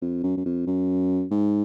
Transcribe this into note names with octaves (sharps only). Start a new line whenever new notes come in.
F2
F#2
F#2
F2
F#2
G#2